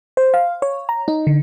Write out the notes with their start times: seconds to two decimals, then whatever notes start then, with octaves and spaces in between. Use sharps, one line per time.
0.17 C5
0.34 F5
0.62 C#5
0.89 A#5
1.08 D#4
1.27 D3